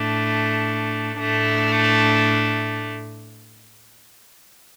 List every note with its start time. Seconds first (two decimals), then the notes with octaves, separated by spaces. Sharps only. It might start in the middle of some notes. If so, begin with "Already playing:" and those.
Already playing: A2 A3 D4
1.21 A2 A3 D4